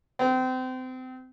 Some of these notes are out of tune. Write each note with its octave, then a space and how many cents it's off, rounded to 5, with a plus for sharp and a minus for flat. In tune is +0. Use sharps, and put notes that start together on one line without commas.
C4 -30